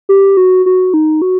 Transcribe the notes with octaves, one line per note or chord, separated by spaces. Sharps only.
G4
F#4
F#4
D#4
F#4